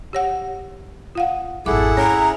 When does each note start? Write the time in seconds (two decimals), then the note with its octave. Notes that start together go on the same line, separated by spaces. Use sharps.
0.13 G4 C#5 F#5
1.15 F4 F5 F#5
1.66 G#1 F2 E4 G#4 A4 F#5 D6
1.97 C#4 C#5 A#5